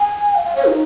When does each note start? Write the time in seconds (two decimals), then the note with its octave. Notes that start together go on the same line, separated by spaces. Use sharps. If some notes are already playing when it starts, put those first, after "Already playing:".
Already playing: G#5
0.35 F5
0.45 F5
0.55 C#5
0.65 D#4